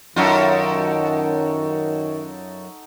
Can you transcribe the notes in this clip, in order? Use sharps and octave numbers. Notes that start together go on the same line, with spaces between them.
F#2 D#3 D#4 F4 F#4 A4